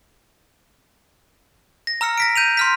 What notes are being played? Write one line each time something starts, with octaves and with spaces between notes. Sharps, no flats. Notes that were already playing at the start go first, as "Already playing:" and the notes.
A#6
A#5 E6 F6 C#7
A#6 B6 D7
G6 D#7 F7
C6 F6 B6